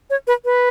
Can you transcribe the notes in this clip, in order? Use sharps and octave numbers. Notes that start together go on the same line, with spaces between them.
C#5
B4
B4